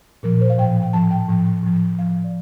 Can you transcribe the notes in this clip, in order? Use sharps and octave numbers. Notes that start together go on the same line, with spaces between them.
A#2 F3 A#4
C5
F5
A2 F3 G5
G5
A2 F3 A5
G5
A2 F3
A2 F3
A2 F3 F5
D5